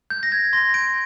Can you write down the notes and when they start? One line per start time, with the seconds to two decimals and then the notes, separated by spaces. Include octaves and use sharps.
0.10 G6
0.23 A#6
0.32 G6 G#6
0.53 C6 A#6
0.74 G6 D7